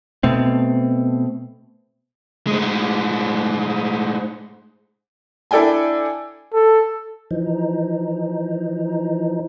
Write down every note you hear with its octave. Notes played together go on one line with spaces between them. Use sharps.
B2 A3 C4
A2 G#3
D4 E4 A4 D5 G5 G#5
A4
E3 F3 D#4